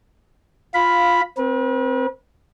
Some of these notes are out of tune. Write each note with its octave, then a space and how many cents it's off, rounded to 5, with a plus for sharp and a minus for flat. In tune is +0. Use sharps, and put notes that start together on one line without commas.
F4 +5 F5 +0 B5 +0
C4 +0 B4 -40